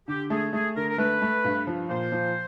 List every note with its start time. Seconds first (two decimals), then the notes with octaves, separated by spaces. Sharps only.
0.08 D3 G4
0.30 A3 G#4
0.53 A3 G#4
0.76 D3 A#4
0.89 A#4
0.98 A3 B4
1.22 A3
1.44 G2
1.67 F3
1.89 A#2 C5
2.12 F3